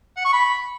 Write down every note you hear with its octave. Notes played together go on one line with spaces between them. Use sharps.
F#5
C#6
B5